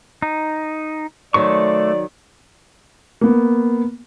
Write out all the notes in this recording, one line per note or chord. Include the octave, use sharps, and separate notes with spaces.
D#4
D#3 F#3 A3 C5 D5 C#6
A#3 B3